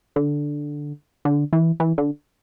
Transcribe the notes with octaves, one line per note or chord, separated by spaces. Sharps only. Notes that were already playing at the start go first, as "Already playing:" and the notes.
D3
D3
E3
E3
D3